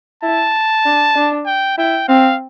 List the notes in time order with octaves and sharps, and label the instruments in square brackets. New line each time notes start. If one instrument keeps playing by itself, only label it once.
[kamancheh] E4 [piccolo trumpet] A5
[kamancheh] D4
D4
[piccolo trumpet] G5
[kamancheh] E4 [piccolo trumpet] G5
[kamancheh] C4 [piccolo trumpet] F5